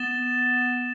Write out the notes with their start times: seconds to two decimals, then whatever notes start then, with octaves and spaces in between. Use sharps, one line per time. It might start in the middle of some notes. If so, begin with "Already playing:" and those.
Already playing: B3 A6 E7 G7